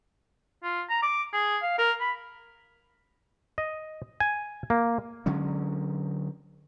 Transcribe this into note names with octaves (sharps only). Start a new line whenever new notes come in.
F4
A#5
D6
G#4
F5
A#4
B5
D#5
G#5
A#3
D3 F#3 G#3 C#4